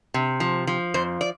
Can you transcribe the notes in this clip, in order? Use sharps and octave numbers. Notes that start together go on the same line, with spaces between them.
C3
F3
F3
F2 C5
D5